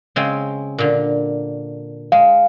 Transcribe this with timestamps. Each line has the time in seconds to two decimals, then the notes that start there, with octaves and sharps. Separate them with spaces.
0.16 C#3 G#3 C4
0.78 A#2 D3
2.12 G#3 F5